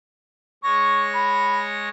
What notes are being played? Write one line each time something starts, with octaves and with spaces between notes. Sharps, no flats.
G#3 C#5 C#6 A#6
B5